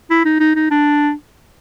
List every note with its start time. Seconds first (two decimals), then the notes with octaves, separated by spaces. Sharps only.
0.10 E4
0.25 D#4
0.40 D#4
0.56 D#4
0.71 D4